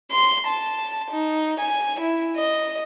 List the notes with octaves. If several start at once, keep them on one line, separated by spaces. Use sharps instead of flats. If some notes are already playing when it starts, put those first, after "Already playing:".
C6
A5
D#4
G#5
E4
D#5